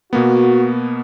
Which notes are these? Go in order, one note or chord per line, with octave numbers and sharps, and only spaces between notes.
B2 A#3 B3 F#4